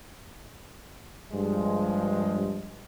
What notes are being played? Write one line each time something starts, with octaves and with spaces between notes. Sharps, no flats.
G2 F3 G#3